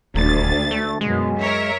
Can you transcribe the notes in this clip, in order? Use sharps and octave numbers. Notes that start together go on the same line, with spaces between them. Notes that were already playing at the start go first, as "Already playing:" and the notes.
D#1 D2 A6
A3
F#2 B2 G#3
A#4 C#5 E5